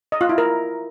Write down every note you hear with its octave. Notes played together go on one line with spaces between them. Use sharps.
D#5
F4
E4
A#4